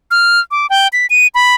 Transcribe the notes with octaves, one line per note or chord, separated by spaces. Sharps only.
F6
D6
G5
B6
D#7
B5